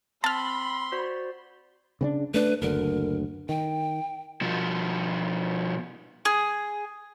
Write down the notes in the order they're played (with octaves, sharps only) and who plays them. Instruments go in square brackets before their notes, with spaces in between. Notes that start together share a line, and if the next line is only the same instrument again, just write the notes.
[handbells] C4 E6 [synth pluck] A5 F6 [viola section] B5 [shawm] C6
[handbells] F#4 C5 D5
[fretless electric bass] C#3 C4 D4
[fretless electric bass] A3 D4 [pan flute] B4
[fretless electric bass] F#1 D2 D3 [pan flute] A#4
[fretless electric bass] D#3 [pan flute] G5
[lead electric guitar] B2 F3
[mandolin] G#4